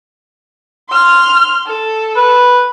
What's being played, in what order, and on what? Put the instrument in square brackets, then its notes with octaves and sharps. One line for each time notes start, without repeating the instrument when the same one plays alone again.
[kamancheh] C6 F6
A4
[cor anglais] B4